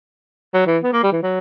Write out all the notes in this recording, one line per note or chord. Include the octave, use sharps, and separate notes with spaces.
F#3
E3
B3
A#3
G3
E3
F#3